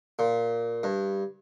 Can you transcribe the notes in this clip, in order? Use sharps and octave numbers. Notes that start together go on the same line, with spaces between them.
A#2
G2